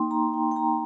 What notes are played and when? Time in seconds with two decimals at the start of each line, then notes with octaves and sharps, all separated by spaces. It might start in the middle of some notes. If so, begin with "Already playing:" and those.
Already playing: A#3 D#4 G5 C6
0.11 A#5
0.34 G5
0.51 G5
0.56 A#5